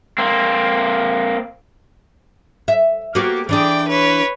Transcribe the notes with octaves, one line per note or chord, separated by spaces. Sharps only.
A#3 C4
E5
A#3 B3 F#4 G4
E3 D4 G#4 D5 G5
B4 C#5